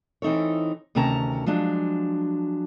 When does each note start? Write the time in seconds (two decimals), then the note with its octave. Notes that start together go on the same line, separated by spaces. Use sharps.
0.22 E3 C4 D#4 A4 C#5
0.95 D2 C3 D#3 C#4 A5 A#5
1.46 F3 F#3 G#3 D4